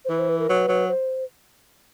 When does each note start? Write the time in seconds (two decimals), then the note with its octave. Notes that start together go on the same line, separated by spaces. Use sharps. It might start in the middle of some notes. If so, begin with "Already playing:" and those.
0.05 C5
0.09 E3 B4
0.19 C5
0.29 B4
0.39 A#4
0.49 F#3 B4
0.68 F#3
0.89 C5